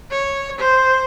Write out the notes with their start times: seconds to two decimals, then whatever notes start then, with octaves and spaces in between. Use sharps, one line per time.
0.11 C#5
0.59 C5